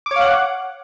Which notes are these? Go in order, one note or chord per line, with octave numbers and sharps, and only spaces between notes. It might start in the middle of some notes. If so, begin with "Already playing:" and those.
C#5 F5 F#5 D6